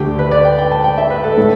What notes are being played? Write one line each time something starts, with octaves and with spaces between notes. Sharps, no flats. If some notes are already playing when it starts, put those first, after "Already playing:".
Already playing: D2 D3 A3 G4
B4
D5
G5
G5
A5
G5
E5
B4
A4
A2 A3 A4